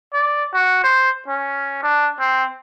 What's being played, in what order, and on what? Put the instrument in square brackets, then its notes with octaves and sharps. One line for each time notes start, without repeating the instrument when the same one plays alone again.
[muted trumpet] D5
F#4
C5
C#4
D4
C4